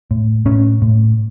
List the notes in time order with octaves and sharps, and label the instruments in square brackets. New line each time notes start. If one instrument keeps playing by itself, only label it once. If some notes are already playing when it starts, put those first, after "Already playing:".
[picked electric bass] A2
A2 C#4
A2